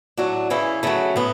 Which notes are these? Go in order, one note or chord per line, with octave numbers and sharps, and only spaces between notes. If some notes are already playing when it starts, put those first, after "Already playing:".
A2 F#3 D4 F#4
C#3 E3 C#4 E4
C#3 F#3 A3 C#4
A2 B3